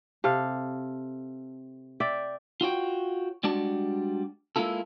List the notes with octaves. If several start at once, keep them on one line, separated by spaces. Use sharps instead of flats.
C3 A4 F5
D5 E5 G5
F4 F#4 C#5 G5
G3 G#3 D4 F#4 D5 A5
G#3 A#3 E4 F4 A4